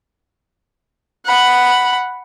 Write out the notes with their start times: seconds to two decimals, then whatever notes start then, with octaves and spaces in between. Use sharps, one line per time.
1.25 F#5 B5